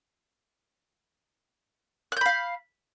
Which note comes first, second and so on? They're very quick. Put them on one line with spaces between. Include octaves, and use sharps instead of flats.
F#6 G6 B5 F5